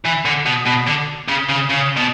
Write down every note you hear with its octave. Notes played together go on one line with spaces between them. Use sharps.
E3
D3
B2
B2
D3
C#3
C#3
C#3
B2